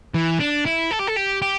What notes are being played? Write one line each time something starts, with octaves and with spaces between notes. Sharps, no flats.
E3
D4
E4
A4
G4
A4
G4
G4